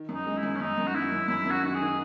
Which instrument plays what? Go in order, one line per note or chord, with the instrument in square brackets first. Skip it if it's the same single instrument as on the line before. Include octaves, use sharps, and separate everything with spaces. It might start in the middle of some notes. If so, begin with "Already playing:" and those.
Already playing: [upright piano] D#3
F#2
[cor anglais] D#4
[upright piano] G#3
[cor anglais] E4
[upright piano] F#2
[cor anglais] C#4
[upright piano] F#2 [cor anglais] D#4
[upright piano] F#2
[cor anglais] F#4
[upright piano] D#3 [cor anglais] E4
[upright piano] F#2
[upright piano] F#2 [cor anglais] E4
[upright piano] F#2
[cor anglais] F#4
[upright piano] D#3 [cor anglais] F#4
[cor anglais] G#4
[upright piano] D#3